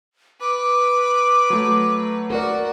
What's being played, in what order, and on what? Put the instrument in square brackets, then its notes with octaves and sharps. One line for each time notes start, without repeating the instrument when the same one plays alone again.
[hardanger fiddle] B4 [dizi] D6
[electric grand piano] F#3 A3
[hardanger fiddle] F#4 [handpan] A#4 D5